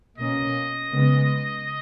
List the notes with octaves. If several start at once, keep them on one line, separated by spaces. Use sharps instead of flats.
B2 A#3 C#4 D#5
C#3 G#3 B3